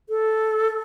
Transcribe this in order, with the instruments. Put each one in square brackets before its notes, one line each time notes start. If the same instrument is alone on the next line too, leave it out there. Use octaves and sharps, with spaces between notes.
[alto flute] A4